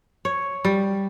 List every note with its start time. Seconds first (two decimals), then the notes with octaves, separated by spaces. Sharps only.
0.25 C#5
0.65 G3